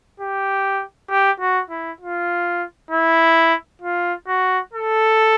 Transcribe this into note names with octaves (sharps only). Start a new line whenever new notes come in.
G4
G4
F#4
E4
F4
E4
F4
F#4
A4